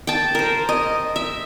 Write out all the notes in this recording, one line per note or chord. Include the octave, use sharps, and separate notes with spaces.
G5 A5
A#4 C5
D#5
E5